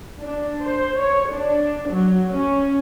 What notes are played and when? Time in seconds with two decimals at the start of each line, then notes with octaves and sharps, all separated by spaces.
0.22 D4
0.65 C5
1.00 C#5
1.33 D4
1.90 F#3
2.37 C#4